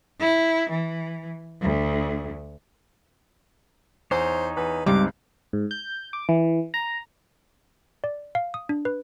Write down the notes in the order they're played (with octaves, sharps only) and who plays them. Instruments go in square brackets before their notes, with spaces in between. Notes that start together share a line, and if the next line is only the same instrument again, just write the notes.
[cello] E4
E3
D2
[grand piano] E2 [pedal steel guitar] D#4 C#5 [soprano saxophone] C5
[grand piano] E2 [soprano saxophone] B4
[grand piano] C#2 G2 [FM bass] G3 [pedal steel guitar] G#3 C4 D#4 [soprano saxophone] D6
[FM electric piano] G#2
G6
D6
E3
A#5
[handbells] D5
F5
D#6
D4
B4